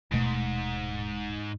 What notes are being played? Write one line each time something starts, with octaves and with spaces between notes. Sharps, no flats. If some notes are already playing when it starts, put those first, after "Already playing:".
D#1 G#2 B2 A3